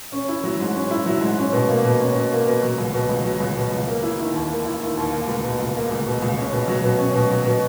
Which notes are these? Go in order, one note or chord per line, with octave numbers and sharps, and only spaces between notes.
C#4
E4
F#3
G#2
C#4
E4
F#3
G#2
C#4
B2
A#3
B2
C#4
B2
A#3
B2
F#3
C#2
B2
C#2
F#3
C#2
B2
C#2
A#3
E4
D#3
D#2
A#3
E4
D#3
D#2
A#3
C#2
B2
C#2
A#3
C#2
B2
C#2
C#4
B2
F#3
B2
C#4
B2
F#3
B2